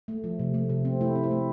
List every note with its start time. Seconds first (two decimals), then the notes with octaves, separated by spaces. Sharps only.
0.08 A3
0.24 F3
0.39 C3
0.54 A3
0.69 C3
0.85 C4
1.01 A3 E4
1.16 C4
1.23 E4
1.31 A3